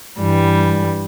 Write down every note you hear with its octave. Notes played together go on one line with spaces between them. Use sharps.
G2 E3 G3